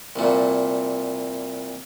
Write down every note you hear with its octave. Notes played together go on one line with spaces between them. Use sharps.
C2 A#2